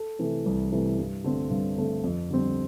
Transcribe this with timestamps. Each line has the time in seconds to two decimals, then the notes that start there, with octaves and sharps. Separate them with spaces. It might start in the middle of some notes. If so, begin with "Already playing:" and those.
Already playing: A4
0.19 C3 E3 A3
0.46 C2
0.72 C3 E3 A3
0.99 G2
1.24 D3 A3 C4
1.50 G2
1.77 D3 A3 C4
2.04 F2
2.30 D3 G3 C4